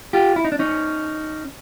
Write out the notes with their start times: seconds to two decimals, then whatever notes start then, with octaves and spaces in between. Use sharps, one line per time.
0.13 F4 G4
0.36 E4
0.45 D#4
0.52 D4
0.59 C#4 D#4